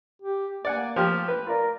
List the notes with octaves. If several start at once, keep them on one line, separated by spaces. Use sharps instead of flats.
G4
A#3 D5 F#5 G#5
F3 G4 F6
B4
F4 A#4 D5